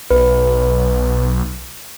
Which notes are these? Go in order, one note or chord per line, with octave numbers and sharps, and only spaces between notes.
B1 B4